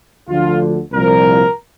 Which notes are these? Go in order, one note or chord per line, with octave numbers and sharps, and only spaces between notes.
D2 D3 F3 F4
C2 A#2 F3 A#4